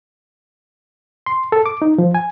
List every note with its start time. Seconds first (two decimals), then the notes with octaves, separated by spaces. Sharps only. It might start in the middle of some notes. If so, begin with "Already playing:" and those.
1.26 C6
1.52 A4
1.66 D6
1.82 D#4
1.98 F3
2.15 G#5